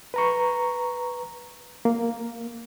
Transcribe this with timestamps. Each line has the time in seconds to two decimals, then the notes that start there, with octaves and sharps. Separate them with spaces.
0.14 B4 A#5 C#6
1.85 A#3